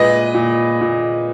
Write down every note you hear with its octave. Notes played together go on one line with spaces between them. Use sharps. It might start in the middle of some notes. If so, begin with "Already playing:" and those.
Already playing: A#2 G#3 B4 D#5
A#2
A#2